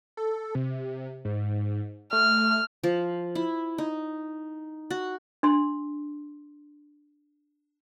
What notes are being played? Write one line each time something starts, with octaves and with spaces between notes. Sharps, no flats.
A4
C3
G#2
A3 F6
F3
E4
D#4
F#4
D4 C6